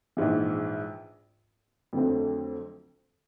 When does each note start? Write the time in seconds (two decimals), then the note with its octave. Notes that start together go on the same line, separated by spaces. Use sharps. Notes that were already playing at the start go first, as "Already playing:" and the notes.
0.17 A#1 G#2 E3
1.93 F2 D3 F#3 A3 C4